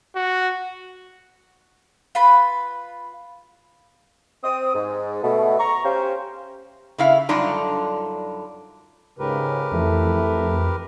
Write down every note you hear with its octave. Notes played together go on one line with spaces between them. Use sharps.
F#4
F4 B4 B5
C4 D#6
G#2
B2 A3
A#5 C#6
C#4 G4 C5 F5
C#3 E4 F5
F#2 D3 G3 D4 D#4 F4
C#2 G#2 C#3 G4 A#4 B4
F2 E3 A3